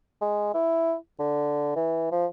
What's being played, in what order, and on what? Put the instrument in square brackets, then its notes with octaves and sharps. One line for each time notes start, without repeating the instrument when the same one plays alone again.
[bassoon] G#3
E4
D3
E3
F3